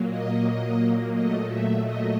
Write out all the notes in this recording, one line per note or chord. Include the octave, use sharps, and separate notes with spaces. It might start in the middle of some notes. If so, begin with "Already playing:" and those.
Already playing: A#2 F#3 A#3
D#5
A#2 F#3 A3 D#5
E5
D#5